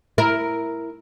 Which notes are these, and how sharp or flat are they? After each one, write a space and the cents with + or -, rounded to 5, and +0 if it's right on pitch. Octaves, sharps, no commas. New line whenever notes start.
E4 +5 A#4 +0